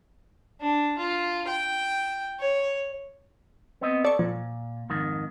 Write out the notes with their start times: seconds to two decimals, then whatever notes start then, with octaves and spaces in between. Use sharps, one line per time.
0.61 D4
0.98 F4
1.47 G5
2.40 C#5
3.81 B3 C4 D#5
4.05 A4 D5 C#6
4.19 A#2 F3
4.90 F2 G#2 D#3